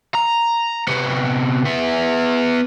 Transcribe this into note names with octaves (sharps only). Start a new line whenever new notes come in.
A#5
C3 B3
B3 E5